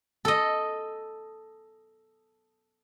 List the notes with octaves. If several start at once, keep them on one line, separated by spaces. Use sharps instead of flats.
A4 D#5